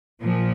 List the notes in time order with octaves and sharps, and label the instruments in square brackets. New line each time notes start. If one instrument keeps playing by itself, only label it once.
[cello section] A#2 F3